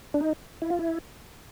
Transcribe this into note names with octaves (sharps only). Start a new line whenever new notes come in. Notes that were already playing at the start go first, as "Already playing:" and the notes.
D4
D#4
E4
F4
E4